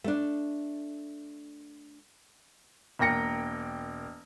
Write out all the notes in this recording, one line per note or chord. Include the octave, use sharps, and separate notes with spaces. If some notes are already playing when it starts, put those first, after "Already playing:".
A3 D4
E1 A#3 G5 A#6 C#7